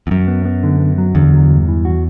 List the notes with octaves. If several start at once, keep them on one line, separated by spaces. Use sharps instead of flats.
E2
F#2 F#3
B3
B3
D3
B3
F#3
E2 D3
F#3
G2
E3
F#4